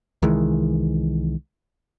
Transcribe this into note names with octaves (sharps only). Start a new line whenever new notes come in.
C2 D#3 E3 G#3